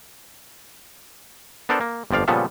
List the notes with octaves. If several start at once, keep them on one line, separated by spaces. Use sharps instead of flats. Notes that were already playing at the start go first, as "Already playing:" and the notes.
B3 D4 A4 A#4 C5 D5
A#3
G1 F2 F3 D5 F5
A#2 C#3 F3 G3 B3 A4